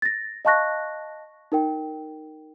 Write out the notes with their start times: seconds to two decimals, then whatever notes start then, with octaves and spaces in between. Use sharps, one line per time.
0.02 A6 A#6
0.45 D#5 F5 A5 C#6 F#6 A#6
1.52 D#4 A#4 G5